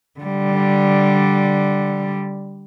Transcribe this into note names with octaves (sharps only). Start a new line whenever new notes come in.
D3 G3